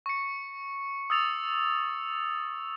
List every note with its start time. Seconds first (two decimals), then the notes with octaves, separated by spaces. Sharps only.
0.06 C#6 C#7
1.10 D#6 E6 A6 F7